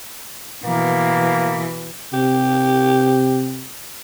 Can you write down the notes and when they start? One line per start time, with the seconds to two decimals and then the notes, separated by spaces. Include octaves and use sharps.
0.65 B2 E3 A#3
2.13 C3 G4